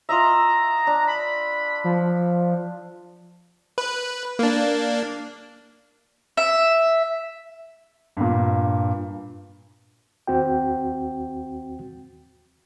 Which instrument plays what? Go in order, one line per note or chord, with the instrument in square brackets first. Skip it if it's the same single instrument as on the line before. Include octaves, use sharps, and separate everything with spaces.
[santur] F4 D#5 E5 [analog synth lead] A#5
[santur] D4
[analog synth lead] B5
F3
[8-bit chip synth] B4
A#3 D4
[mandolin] E5
[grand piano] G2 A#2
[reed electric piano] D#2 C4 F#4 G5